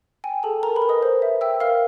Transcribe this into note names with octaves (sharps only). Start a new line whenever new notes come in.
G5 G#5
G#4 A4 A5
A#4 A#5
B4 B5
A#4
D#5 D#6
C5
E5
E5 G5 E6
A#4 F5 F6